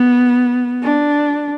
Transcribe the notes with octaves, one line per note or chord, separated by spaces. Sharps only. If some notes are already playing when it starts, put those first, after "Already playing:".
Already playing: B3
D4